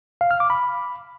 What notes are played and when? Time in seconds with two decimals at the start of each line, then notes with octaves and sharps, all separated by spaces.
0.21 F5
0.31 F6
0.40 D6
0.50 B5